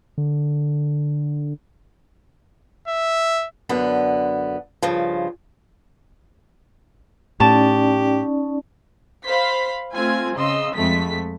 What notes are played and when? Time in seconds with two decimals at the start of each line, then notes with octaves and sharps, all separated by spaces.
0.18 D3
2.88 E5
3.69 F#2 D3 B3
4.83 G2 C#3 F3
7.40 A2 C#4 D#4 G4 D5 A5
9.26 C5 F5 B5 B6
9.94 A3 C4 F4 G#5
10.36 C#3 D#5 C6 E6
10.74 F2 G#3 A3 B6